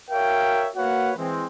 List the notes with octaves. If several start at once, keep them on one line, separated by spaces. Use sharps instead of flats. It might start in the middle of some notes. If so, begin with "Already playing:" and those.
F#4 A#4 C#5 E5 F5 G5
A#3 F#4 B4 C#5 F5 F#5
E3 G#3 C4